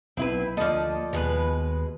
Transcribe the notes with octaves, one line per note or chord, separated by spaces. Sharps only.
B1 C4 E4 B4
D2 F3 A#3 A4 D5 D#5
D#2 B2 G#3 B4